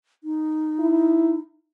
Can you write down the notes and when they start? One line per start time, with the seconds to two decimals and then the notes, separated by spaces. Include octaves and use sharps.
0.24 D#4
0.80 E4